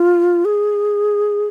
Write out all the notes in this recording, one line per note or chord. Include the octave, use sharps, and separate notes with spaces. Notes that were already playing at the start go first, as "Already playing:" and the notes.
Already playing: F4
G#4